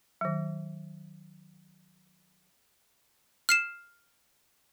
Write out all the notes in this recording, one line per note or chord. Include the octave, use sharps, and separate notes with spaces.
D#3 F#3
F6 C7 E7